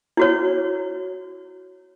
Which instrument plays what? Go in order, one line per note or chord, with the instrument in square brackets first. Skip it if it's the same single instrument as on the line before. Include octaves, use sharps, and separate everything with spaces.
[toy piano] E4 F#4 C#5